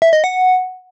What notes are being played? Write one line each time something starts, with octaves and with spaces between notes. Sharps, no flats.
E5
D#5
F#5